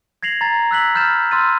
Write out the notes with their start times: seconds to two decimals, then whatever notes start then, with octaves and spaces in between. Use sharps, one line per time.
0.23 G#6 A#6 C7 F7 F#7
0.41 A#5 A6
0.71 E6 F#6 B6 F#7
0.95 B5 F6 G6 A6 E7
1.31 C6 E6 F6 A6 D#7